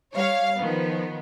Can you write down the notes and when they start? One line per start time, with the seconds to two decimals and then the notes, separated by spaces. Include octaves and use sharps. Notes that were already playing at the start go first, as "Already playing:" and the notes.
0.14 G3 C#5 F5
0.58 D#3 F3 B3